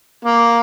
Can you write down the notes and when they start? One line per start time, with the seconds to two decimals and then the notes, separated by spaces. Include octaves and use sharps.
0.25 A#3